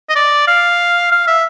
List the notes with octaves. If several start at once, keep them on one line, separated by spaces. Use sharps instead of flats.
D#5
D5
F5
F5
E5